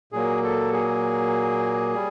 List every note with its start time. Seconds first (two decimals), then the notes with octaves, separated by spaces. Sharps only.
0.12 A#2 F#3 A#3 G#4
0.44 A4
0.73 G#4
1.95 G3